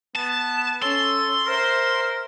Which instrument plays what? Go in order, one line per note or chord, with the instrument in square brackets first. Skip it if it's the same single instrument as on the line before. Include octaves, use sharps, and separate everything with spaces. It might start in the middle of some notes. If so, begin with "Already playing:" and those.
[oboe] B3 [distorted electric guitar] A5
[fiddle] C#4 [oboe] A4 [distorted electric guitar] C6
[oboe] A#4 [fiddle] C5 E5